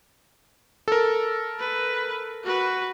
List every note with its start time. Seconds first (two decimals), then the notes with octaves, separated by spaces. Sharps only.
0.88 A4 A#4
1.59 B4
2.43 F#4 B4